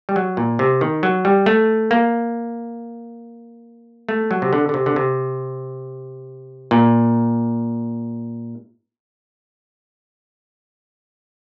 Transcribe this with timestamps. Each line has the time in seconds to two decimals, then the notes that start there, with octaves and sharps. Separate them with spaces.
0.09 G3
0.16 F#3
0.37 A#2
0.59 C3
0.81 D#3
1.03 F#3
1.25 G3
1.46 A3
1.91 A#3
4.09 A3
4.31 F#3
4.42 C3
4.53 D3
4.69 D3
4.74 C3
4.86 D3
4.96 C3
6.71 A#2